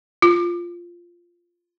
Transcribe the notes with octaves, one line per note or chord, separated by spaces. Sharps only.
F4